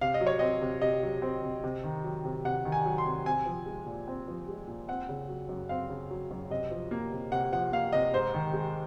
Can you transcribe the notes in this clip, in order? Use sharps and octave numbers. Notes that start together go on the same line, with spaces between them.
C3 F5
D#5
F#3
C#5
C4 D#5
C3
C3 D#5
F#3
C4
C3
C3
D#3
F#3
C3
C3 F#5
D#3
G#5
F#3
C6
C3
C4 G#5
F3
G#3
A#2
C4
F3
G#3
A#2
C4 F#5
C#3
F#3
F#2
C4 F5
C#3
F#3
F#2
C3 D#5
F3
A#3
C3
C3 F#5
F3 F#5
A#3 F5
C3 D#5
G#2 C5
D#3
G#3